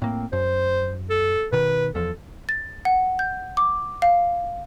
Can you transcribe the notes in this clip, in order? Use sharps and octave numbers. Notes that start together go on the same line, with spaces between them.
A2 A#3 C4
F#2 C5
A4
B2 D#3 B4
E2 F3 A4
A6
F#5
G6
D6
F5